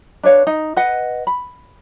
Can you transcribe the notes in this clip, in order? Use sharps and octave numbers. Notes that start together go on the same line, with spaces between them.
D4 B4 C#5 F5
D#4
B4 D#5 F#5
B5